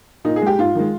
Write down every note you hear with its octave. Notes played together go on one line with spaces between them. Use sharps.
A#2 D#4
G#4
G#3 G4
G#2 F4
D#3 G#3